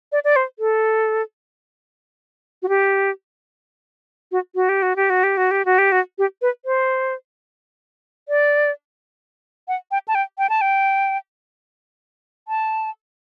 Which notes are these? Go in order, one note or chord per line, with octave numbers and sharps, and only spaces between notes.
D5
D5
C5
A4
F#4
G4
F#4
F#4
G4
F#4
G4
F#4
G4
F#4
G4
F#4
G4
F#4
G4
B4
C5
D5
F#5
G5
A5
G5
G5
A5
G5
A5